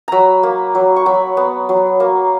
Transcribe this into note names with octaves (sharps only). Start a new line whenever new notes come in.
F#3 A#5 B5
A#3
F#3
C#6
F#3 B5
B3
F#3
A#3